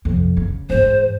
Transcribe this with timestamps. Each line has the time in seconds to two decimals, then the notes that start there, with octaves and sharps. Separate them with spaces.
0.05 F2 C3
0.37 C#3
0.70 E2 G#2 C5